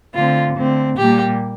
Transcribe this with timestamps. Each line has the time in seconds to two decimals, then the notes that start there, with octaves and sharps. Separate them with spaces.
0.14 D3 A3 C4 F4
0.55 D3 A3 C4
0.96 A#2 G3 A#3 G4